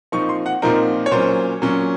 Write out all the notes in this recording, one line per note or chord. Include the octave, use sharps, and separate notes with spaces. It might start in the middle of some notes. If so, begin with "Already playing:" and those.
A#2 F3 C4 D#4 C#6
C6
F#5
A#2 F3 C4 D#4 A#4
C#5
A#2 F#3 C#4 C5
A#2 F#3 C#4